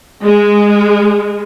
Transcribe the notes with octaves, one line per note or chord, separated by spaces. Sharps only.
G#3